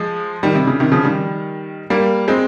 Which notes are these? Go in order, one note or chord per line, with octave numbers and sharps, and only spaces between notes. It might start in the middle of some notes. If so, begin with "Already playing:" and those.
Already playing: F3 G#3
D#3 G3
C3
C#3
C3 D#3
C#3 F3
D#3 G3
G3 A#3
G#3 C4